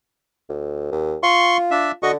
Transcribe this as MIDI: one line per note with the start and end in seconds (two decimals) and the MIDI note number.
0.49 0.87 38
0.92 1.16 39
1.23 1.95 65
1.23 1.57 84
1.23 1.57 85
1.71 1.92 62
1.71 1.92 76
2.03 2.16 50
2.03 2.11 66
2.03 2.11 75
2.03 2.11 85